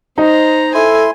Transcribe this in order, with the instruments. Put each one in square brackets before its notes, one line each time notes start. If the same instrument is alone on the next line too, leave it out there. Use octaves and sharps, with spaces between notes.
[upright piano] D#4 [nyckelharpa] C5 A#5
[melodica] E4 C6 [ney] A4 [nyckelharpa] G#5